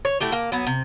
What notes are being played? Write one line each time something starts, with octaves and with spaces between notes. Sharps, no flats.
C#5
A3 E4 F#4 G4
A#3
F#3 B3
C3